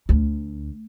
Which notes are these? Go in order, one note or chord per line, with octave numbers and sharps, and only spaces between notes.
D2